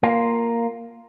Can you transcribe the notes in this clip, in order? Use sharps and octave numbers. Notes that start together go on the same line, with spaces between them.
A#3 F4